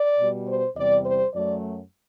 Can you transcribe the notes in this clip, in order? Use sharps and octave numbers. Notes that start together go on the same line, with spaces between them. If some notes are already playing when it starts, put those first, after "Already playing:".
Already playing: D5
B2 G3
C5
E2 C3 G3 D5
C5
F#2 F#3 A3 D5